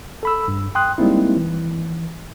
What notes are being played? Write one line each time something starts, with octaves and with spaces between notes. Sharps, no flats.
A4 B5 E6
G2
G5 C6 D#6 F#6
G3 G#3 A#3 C4 D#4 E4
E3